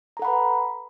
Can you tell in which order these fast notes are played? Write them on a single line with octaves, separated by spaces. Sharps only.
A#5 A4 F#5 B5 B4